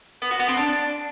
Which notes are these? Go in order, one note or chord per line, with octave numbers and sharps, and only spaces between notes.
B3
F#4
B3
C4
D4